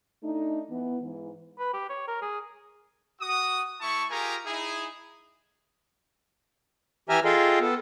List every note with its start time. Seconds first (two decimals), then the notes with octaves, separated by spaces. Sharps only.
0.22 A3 D4 D#4
0.70 E3 B3
1.01 G#2 E3
1.59 B4
1.74 G4
1.89 C#5
2.08 A#4
2.22 G#4
3.21 F#4 D#6
3.81 A3 E4 A5 C#6
4.10 F4 G4 G#4 A#4 G#5 A#5
4.45 D#4 E4 G#4
7.09 E3 G4 E5 G#5 A#5 F6
7.25 F4 G#4 A4 D#5 F5 G5
7.60 B3 A4